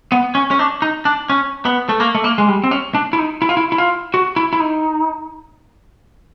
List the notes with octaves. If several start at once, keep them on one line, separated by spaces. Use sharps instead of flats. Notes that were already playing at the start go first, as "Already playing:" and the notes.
B3
C#4
C#4
D4
D#4
D4
C#4
B3
A3
A#3
A3
A#3
G#3
G3
C4
C#4
D4
E4
D#4
E4
F4
E4
E4
F4
F#4
E4
E4
D#4